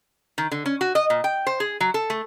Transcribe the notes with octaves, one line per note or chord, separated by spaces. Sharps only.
D#3
D3
C#4
F#4
D#5
A#2
G5
C5
G#4
F#3
A4
A3